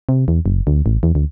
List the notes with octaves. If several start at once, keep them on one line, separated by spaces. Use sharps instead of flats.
C3
E2
F#1
D2
A1
E2
D2